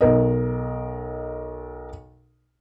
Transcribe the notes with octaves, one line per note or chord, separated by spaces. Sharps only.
B1 A#4 D#5